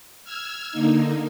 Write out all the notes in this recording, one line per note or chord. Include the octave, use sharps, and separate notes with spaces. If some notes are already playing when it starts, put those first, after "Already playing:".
E6 F6 G#6
D3 A#3 D#4